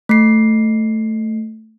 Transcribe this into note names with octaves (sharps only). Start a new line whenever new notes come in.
A3 C7